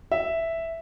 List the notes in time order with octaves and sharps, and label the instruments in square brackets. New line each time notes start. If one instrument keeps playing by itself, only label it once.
[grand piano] E5